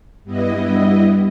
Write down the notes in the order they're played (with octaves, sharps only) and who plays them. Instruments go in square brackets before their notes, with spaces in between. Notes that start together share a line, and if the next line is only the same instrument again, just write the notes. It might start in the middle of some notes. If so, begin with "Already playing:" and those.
[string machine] G2 G3 B3 E4 D#5